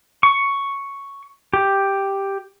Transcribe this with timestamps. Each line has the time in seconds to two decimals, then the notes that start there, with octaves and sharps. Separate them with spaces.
0.23 C#6
1.53 G4